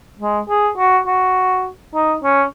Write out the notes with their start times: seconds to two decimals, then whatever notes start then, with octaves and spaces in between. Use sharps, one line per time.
0.19 G#3
0.49 G#4
0.78 F#4
1.07 F#4
1.95 D#4
2.23 C#4